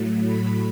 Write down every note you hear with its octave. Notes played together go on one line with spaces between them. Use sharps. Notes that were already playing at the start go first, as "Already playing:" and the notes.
Already playing: A2 F#3 A3
B5